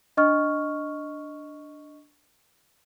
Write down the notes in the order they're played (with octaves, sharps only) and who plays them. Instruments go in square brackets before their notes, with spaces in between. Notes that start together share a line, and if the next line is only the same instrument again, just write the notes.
[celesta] D4 D#5 C#6 F6